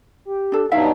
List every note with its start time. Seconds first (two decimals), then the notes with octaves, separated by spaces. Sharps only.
0.25 G4
0.52 D4 A4
0.71 G2 B2 F#3 D#4 E4 E5 F5